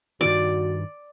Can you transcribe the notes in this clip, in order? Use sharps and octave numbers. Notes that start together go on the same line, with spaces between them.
G2 D#3 F#4 D5